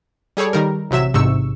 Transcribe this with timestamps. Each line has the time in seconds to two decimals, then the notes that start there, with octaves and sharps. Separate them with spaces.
0.37 G3 G#4 A4 C#5 D5
0.53 D#3 G3 A#4
0.91 A1 C3 F#3 E5 E7
1.14 A1 G#2 C3 C#6 E6